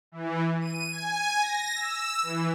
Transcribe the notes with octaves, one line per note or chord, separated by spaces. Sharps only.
E3
D#7
G#5
A#6
E6
E3